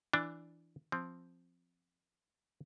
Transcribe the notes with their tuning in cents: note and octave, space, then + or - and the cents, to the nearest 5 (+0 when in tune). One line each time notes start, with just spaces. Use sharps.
E3 +10 D4 +0
F3 +0 C4 +0